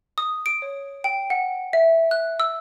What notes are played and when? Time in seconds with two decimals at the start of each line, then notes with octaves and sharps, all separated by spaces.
0.18 D#6
0.46 D7
0.62 C#5
1.04 G5
1.30 F#5
1.73 E5
2.11 F#6
2.40 E6